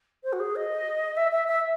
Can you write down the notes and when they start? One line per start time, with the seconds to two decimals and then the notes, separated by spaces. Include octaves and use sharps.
0.23 C5
0.32 F#4
0.39 G#4
0.55 D#5
1.16 E5
1.31 E5
1.47 E5